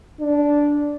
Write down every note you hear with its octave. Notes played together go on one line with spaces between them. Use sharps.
D4